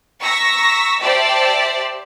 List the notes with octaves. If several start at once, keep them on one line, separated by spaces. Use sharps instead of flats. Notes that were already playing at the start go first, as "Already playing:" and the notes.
A#5 C#6 E6 A#6 B6
G4 C5 D5 E5 A5